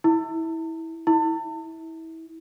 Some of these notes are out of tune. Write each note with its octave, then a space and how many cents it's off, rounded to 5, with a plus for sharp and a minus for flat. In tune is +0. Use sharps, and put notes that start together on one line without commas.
E4 -20
E4 -25